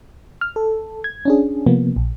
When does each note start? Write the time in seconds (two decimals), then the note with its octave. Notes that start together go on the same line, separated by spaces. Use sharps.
0.41 F6
0.56 A4
1.04 G#6
1.25 C#4 D4 G#4
1.66 C3 F3 A#3 B3
1.96 A#1